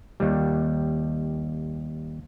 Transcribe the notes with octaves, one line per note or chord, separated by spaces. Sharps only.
D#2 G3